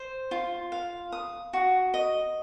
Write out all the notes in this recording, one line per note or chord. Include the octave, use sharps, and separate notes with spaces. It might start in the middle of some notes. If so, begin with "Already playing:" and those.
Already playing: C5
F4
F5
D#6
F#4
D#5